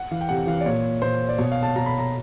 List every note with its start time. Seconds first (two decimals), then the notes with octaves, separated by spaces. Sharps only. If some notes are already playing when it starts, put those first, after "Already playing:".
Already playing: F#5
0.11 E3 F5
0.21 G5
0.29 C3 F#5
0.47 E3 F5
0.61 D5
0.66 A#2 C#5
1.02 A#2 C5
1.29 D5
1.38 B2 C#5
1.52 F5
1.63 A5
1.76 B2 A#5
1.86 B5
1.98 A#5